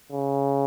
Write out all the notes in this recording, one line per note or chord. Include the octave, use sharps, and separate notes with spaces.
C#3